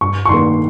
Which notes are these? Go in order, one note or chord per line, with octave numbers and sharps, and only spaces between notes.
G2 C#6
C#6
D#3 A#3 C6